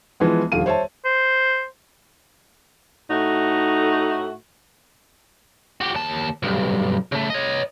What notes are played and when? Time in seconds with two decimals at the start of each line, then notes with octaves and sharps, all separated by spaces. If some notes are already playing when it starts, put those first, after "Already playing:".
0.20 E3 F3 G#3 B3
0.52 D#1 D3 F3 F5 D#7
0.66 C5 C#5 E5 A5
1.05 C5
3.10 A2 A3 D#4 F#4
5.81 F#4 G4
5.95 D#2 A5
6.43 B1 G2
7.12 C#3 A3
7.30 C#5 D#5